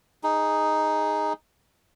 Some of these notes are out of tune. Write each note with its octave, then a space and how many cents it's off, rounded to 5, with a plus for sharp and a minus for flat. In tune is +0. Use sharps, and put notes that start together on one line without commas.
D#4 +0 G#4 +0